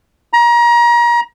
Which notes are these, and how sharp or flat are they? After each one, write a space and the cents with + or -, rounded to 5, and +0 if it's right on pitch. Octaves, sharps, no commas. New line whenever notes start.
A#5 +30